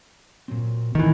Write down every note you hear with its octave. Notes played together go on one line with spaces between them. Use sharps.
A#2 F#3 C4
A#2 D#3 E3 A3 C4